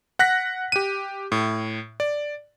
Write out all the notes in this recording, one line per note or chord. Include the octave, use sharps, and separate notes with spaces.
F#5 F#6 A#6 B6
G4 D#7
A2
D5